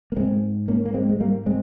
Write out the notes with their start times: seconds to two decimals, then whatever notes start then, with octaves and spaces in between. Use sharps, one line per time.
0.12 A#3
0.16 G#2 G#3 C4
0.68 A#3 C#4
0.85 A#3
0.94 G#3 C4
1.09 G#3
1.20 G3 A#3
1.46 G#3 C4